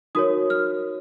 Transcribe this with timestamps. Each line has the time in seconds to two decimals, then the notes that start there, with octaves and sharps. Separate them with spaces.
0.15 D#4 F#4 A#4 C#5 D#6
0.50 F6